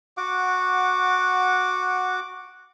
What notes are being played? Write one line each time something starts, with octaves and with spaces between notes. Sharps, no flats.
F#4 F#5 D6